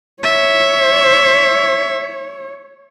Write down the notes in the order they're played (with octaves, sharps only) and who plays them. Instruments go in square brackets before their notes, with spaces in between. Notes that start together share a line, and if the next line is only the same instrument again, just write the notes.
[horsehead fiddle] C#5 [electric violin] E5